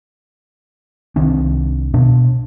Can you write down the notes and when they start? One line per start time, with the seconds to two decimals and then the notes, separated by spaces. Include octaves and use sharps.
1.16 C2 D#3 C4 D4
1.94 B2 D4